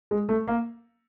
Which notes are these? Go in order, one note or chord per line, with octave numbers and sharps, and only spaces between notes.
G#3
A3
A#3